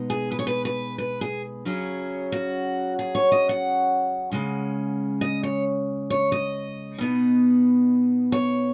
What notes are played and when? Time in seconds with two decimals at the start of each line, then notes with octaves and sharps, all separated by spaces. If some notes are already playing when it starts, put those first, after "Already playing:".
Already playing: B2 G#3 B3 D#4
0.10 G#4
0.31 B4
0.39 C#5
0.47 B4
0.65 B4
0.98 B4
1.21 G#4
1.65 C#3 F#3 C#4 G#4
2.32 F#4
2.99 G#4
3.15 C#5
3.32 D#5
3.49 F#5
4.31 C#3 G#3 C#4
5.21 D#5
5.43 C#5
6.10 C#5
6.32 D#5
6.98 B2 B3 D#4
8.32 C#5